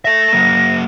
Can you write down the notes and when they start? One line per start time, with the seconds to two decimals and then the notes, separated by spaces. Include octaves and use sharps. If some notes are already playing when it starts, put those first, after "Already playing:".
0.05 A4 E5 A#6
0.32 F#3 A#3